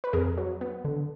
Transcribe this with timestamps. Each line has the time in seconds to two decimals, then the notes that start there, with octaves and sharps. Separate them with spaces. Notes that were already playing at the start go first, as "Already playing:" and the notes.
0.04 B4
0.13 F2 G#4 A#4
0.37 F#3
0.61 B3
0.85 D3